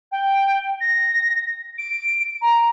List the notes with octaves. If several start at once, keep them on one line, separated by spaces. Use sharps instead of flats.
G5
A#6
D7
A#5